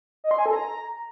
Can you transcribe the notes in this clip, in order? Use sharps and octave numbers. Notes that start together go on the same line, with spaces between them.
D#5
C6
G#5
A4
A#5